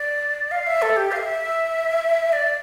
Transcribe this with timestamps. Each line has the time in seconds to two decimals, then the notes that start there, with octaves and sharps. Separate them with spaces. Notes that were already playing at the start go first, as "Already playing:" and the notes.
Already playing: D5
0.51 F5
0.67 E5
0.82 A4
0.97 G4
1.12 F5
1.16 E5
2.33 D5